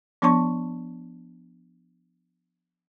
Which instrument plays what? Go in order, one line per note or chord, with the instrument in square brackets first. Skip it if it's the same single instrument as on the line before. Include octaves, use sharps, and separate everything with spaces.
[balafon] F3 B3 D4 C#5 A5 C#6